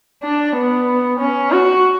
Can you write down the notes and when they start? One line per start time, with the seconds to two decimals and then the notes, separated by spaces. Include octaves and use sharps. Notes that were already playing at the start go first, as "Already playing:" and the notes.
0.23 D4
0.55 B3
1.20 C#4
1.51 F#4